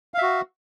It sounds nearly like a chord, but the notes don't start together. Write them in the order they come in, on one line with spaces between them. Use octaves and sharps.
F5 E5 F#4